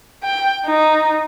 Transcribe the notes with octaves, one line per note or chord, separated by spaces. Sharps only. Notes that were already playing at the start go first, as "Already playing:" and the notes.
G5
D#4